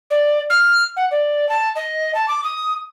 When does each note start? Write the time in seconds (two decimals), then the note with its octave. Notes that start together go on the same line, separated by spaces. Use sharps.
0.10 D5
0.50 F6
0.96 F#5
1.11 D5
1.49 A5
1.75 D#5
2.14 A5
2.28 D6
2.43 D#6